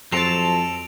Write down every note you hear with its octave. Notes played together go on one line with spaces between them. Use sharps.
F2 F#3 A4 C5 A5 D7 F7